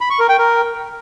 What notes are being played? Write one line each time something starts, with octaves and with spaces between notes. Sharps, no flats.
B5
C#6
A#4
G5
A#4